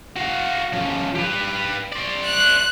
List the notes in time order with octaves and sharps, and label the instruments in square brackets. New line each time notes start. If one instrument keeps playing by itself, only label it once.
[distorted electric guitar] F#4 F5
F3 C#4
G4 B4
C5 D5
[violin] F#6